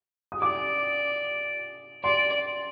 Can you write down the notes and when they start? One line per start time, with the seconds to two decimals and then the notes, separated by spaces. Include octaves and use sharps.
0.32 D#6
0.42 D5 D6
2.04 D5 C6